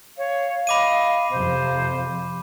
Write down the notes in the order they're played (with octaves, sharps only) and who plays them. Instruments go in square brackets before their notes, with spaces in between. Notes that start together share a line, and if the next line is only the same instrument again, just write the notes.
[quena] C#5 [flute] F5
[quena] D#5 [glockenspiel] B5 D6 D#7
[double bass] F2 C3 [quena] C5